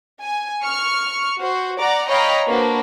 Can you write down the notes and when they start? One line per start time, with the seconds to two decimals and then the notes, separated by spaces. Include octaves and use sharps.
0.23 G#5
0.63 C#6 F6 C#7
1.40 F#4 C5
1.80 D5 F#5 A#5 D6
2.10 C#5 D#5 F5 G5 A#5 B5
2.47 A#3 D4 F#4 B4 C5